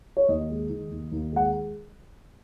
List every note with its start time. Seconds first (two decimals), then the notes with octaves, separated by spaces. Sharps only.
0.17 C#5
0.29 D#2 D#5
0.50 G#3
0.69 D#3
0.91 D#2
1.12 D#2
1.33 G#3 F#5